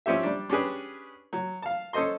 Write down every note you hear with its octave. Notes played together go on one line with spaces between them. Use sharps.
F3 C4 C#4 G4 E5
G3 D4
C#4 D4 G4 G#4 B4
F#3
F5 A5
C#4 A4 C5 D#5 C6